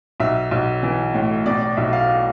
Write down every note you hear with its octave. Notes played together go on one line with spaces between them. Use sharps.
B1 E5
B1
E3
A2
B2 D5
D5
B1 E5
F5